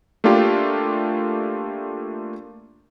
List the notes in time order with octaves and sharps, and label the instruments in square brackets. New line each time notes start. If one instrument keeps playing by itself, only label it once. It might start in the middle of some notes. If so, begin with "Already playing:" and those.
[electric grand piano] A3 A#3 D4 F4 G4